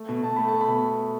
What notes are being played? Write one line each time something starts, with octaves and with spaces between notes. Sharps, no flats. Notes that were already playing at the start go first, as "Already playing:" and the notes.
Already playing: A3
B2
B2 A5
A3 B5
A3 A5
B5
B2